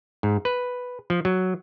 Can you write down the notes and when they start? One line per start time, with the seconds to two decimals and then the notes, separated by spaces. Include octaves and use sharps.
0.23 G#2
0.45 B4
1.10 F3
1.25 F#3